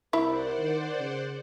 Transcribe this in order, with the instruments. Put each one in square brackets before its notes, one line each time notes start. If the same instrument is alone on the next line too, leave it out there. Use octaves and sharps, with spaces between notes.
[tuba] C2 [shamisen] E4 E5 [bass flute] A#4 [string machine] C5 D5 F#5
[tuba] D#3
C#3